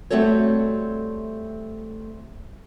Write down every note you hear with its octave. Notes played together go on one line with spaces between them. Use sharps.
G3 A3 C4 F#4 A4 C#5